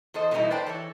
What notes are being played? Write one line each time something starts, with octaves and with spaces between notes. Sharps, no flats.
E2 A4 C5 D#5
B2 E3 G3 C4 D#4 E4
B4 C5 D5 G5 A5
E3 A4 C#5